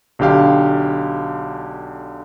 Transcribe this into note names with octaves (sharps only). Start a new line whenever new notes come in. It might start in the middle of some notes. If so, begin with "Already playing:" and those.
B1 D3 G4 F5